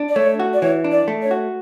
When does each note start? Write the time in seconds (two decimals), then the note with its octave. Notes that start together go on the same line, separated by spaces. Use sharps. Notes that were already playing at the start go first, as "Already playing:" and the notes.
Already playing: D4
0.09 D5
0.16 A3 C#5
0.39 F#4
0.54 D5
0.62 E3 C#5
0.84 D4
0.92 D5
1.08 A3
1.22 C#5
1.31 F#4